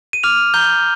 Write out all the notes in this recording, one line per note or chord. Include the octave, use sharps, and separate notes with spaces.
D#7
D6 F6 F7
A#5 G6 G7